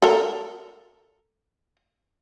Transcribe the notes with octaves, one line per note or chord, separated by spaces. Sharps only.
A4 A#4